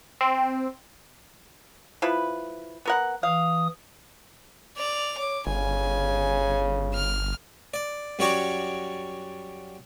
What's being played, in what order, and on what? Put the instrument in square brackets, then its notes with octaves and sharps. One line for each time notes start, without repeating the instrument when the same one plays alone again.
[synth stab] C4
[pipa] F3 E4 B4
B3 A#4 F#5
[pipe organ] E3 D#6 [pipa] F5
[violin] D5 F7
[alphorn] C#5 [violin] D6
[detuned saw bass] G1 [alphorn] C#3 [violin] G#5
[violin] F6
[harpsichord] D5
F#2 G3 F#4 C#5 D5 D6